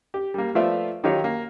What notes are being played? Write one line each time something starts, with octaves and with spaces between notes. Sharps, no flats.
G4
G3 A#3
F3 A3 B3 F4 D5 E5
D#3 F#3 D#4 F4 G4 C#5
A#3